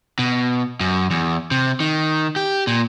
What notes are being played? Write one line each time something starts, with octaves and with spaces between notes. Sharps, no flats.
B2
F#2
E2
C3
D#3
G4
A#2